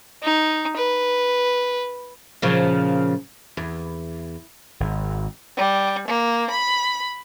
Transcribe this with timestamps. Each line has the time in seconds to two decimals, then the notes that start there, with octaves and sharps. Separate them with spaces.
0.23 D#4
0.77 B4
2.42 A#2 C#3 F3
3.57 E2
4.80 G#1
5.59 G3
6.08 A#3
6.50 B5